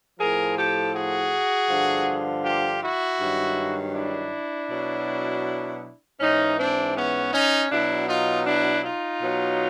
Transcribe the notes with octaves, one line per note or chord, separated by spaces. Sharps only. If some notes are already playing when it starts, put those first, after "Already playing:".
A2 F3 G#4 A#4
G4 A4
F#4 G#4
G2 D3 F3
F4 G4
E4 F#4
G2 D#3 F#3
D4 E4
B2 F#3
G#2 E3 C#4 D#4
C4 D4
B3 C#4
C#4 D#4
B2 F#3 D4 E4
D#4 F4
D4 E4
D#4 F4
B2 F#3